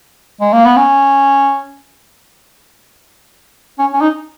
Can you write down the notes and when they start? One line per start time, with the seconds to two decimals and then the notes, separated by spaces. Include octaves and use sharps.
0.41 G#3
0.53 A#3
0.65 B3
0.77 C#4
3.79 C#4
3.93 C#4
4.01 D#4